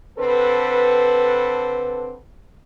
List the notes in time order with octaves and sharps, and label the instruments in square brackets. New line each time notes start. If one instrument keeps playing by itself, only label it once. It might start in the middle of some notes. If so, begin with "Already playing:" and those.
[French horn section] D3 C4 A4 B4